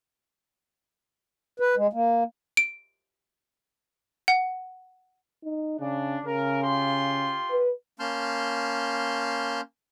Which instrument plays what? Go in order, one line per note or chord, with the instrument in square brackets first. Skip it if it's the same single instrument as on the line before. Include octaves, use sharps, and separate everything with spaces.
[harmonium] B4
G#3
A#3
[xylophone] D7
F#5
[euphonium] D#4
[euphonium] C#3 [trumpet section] D4
[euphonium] C#3 [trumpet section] A#4
[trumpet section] F4 G4 C6
[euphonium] B4
[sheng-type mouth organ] A#3 C#4 A5 C6 F6 G6